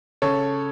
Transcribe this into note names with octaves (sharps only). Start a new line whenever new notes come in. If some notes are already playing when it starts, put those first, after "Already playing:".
C#3 A4 C#5